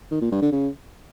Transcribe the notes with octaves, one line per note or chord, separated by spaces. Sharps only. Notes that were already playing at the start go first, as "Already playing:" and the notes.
D#3
A#2
G2
D3
C#3